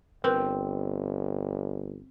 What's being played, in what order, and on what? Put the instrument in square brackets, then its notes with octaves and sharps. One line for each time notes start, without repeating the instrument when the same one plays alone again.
[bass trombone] G1 [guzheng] C4 [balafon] A#4 B4